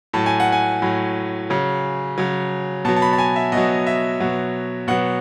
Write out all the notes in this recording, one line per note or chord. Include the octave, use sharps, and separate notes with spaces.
A2 F#3 A5
G#5
F#5
G#5
A2 F#3
C#3 F#3
C#3 F#3
B2 F#3 A5
A5
B5
A5
G#5
E5
B2 F#3 D#5
E5
B2 F#3
B2 F#3 F#5